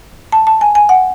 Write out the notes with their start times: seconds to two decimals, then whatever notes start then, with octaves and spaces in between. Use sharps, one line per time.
0.32 A5
0.47 A5
0.61 G#5
0.75 G#5
0.89 F#5